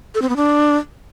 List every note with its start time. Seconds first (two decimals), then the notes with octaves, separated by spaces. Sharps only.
0.15 A4
0.22 C4
0.29 B3
0.36 D4